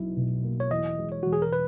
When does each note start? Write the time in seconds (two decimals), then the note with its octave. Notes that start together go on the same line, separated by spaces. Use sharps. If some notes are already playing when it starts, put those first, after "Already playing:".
Already playing: B1 B2 E4
0.17 B2
0.43 A#3
0.60 C#5
0.71 E2 D#5
0.98 G#3
1.12 C#5
1.23 E1 F#4
1.33 G#4
1.42 A#4
1.53 B4